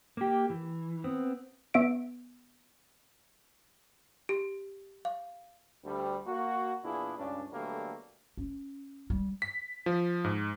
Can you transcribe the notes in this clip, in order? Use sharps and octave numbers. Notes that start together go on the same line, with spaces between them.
A#3 G4
E3
B3 C4
B3 E5 D7
G4
F5
D2 G3
A#3 F#4
E2 A#2 D4 E4 G#4
C#2 G2 C#4 D4
B2 D3 F#3 G3 A3 A#3
C#4
G3
B6
F3
G#2